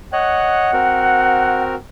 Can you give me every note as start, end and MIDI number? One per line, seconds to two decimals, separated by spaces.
0.13 0.71 73
0.13 0.71 75
0.13 1.76 78
0.13 0.71 90
0.73 1.75 60
0.73 1.75 66
0.73 1.75 70